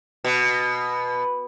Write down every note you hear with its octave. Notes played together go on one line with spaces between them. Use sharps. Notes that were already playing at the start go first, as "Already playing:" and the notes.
B2